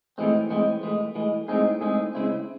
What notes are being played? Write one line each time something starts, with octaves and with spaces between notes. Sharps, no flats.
A2 E3 G#3 C4
A2 E3 G#3 C4
A2 E3 G#3
A2 E3 G#3
A2 G#3 C4 D#4 G#4
A2 G#3 C4 D#4 G#4
C#3 G#3 C4 E4